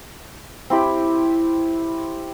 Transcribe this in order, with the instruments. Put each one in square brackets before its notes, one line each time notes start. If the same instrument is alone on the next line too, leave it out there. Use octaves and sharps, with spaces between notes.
[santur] C4 E4 G4 B5